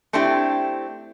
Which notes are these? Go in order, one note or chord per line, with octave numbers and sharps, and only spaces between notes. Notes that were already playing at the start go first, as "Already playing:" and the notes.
A3 C4 D4 E4 G4